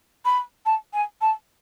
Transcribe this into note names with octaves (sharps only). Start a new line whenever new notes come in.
B5
A5
G#5
A5